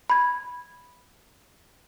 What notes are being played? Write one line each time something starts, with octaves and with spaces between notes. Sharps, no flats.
B5 G#6